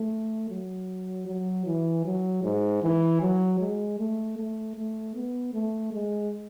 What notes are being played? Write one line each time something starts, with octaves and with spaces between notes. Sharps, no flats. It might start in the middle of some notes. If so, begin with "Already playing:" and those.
Already playing: A3
F#3
F#3
E3
F#3
G#2
E3
F#3
G#3
A3
A3
A3
B3
A3
G#3